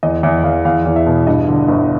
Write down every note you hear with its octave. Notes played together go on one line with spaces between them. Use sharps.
E2 D#5
E2 E5
E2 F5
E2 F5
E2
E5
B2
G2 D#5
D3
G1